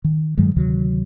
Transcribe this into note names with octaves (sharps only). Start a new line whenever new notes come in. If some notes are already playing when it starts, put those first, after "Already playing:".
D#3
G2 D#3 F#3 G#3
D2 C3 D#3 F#3